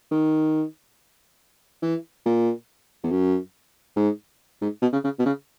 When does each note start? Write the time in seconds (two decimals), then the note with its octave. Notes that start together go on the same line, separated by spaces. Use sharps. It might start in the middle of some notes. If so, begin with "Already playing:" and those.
0.11 D#3
1.82 E3
2.26 A#2
3.04 E2
3.11 F#2
3.96 G#2
4.62 G#2
4.82 B2
4.93 C#3
5.04 C#3
5.19 B2
5.26 C#3